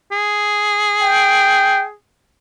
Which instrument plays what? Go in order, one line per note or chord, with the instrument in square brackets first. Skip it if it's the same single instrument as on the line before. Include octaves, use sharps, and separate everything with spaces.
[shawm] G#4
[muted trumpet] G5